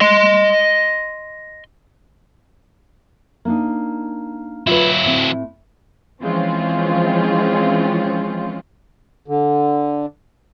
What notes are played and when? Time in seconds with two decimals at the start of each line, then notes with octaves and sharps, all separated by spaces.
0.01 D#5 C6
3.45 A#3 D4 D#4
4.67 F#3 E4 F4 B4
5.04 A2 C4
6.22 E3 F3 G#3 C4 C#4 F4
9.28 D3